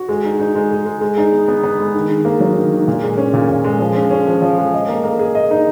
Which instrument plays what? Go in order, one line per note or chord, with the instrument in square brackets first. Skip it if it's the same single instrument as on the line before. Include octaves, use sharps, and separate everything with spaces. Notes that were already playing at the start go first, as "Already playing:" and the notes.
Already playing: [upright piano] F#4
G#3
D#4
D#4
G#3
G#4
G#3
G#3
D#4
B3
B3
B3
G#3
D#3
D#3
A#3
F#3
D#3
D#3
A#2
G#3
C#4
A#2
A#2
G#3
F3
C#4
C#4
F3
F3
G#3
D#5
A#3
A#3
G#4
D#5
D#4